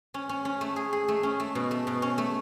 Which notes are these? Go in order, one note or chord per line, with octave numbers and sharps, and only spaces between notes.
C#4
C#4
C#4
A3
G#4
G#4
A3
C#4
A3
B2
A3
B2
C#4
A3